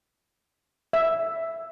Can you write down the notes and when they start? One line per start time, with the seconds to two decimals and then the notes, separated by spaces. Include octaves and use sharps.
0.93 E5